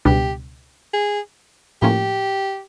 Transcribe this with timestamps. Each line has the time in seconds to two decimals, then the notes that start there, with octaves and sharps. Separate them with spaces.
0.05 C#2 B2 G3 B3 D4 G4
0.94 G#4
1.82 A2 F3 A#3 C#4 G4